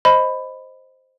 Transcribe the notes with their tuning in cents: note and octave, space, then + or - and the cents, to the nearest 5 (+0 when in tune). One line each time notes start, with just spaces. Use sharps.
C5 +0 D#5 +0 B5 +10